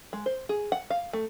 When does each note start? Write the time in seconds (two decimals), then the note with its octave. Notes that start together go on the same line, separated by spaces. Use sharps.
0.13 G#3
0.26 C5
0.49 G#4
0.72 F#5
0.90 F5
1.13 A3